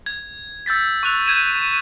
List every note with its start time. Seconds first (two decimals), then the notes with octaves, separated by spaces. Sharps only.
0.06 G#6
0.66 E6 G6 A6 B6
1.03 C#6 E6 F#6 F7
1.26 G6 G#6 D#7 E7